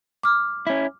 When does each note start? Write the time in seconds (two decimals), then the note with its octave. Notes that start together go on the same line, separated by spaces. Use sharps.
0.23 D6 F6
0.67 C#4 E4